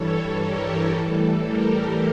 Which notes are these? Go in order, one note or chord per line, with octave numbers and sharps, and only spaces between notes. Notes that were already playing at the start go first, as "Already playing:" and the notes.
Already playing: G2 E3 G3 A4 C#5
G4 A#4
A2 E3 G3 A4
G4 A#4